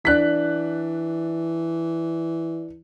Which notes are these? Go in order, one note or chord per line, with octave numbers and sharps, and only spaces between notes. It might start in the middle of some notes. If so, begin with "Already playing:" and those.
E3 D4 F#6 B6